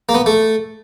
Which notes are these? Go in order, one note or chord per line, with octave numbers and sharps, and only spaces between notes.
A#3
B3
A3